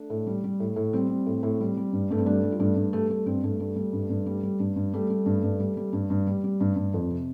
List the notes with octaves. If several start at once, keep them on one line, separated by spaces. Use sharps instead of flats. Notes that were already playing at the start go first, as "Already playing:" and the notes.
Already playing: A3 D4
A2
G3
G3
A2
A2
G3 C4
G3
A2
A2
G3
G3
G2
G2 A3
C4
G3 A3 D4
G3
F4
G2 A3 D4
G2
G3 A3
G3 A3
G2 C4
G2 A3
G3 A3
G3
G2
G2
G3
G3
G2
G2
G3 A3
G3
G2
G2
G3
G3
G2
G2
G3
G3
G2
G2
F2
C3